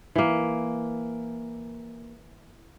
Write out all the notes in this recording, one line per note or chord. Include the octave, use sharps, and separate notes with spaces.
E3 A#3